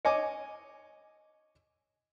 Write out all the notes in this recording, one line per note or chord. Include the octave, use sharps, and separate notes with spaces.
C#5 D#5 G#5 D6